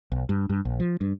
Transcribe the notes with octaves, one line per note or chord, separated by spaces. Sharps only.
B1
G2
G2
A#1
F3
G2